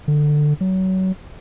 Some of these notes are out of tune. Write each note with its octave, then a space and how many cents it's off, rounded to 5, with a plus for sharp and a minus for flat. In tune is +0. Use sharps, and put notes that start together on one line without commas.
D3 +15
F#3 +25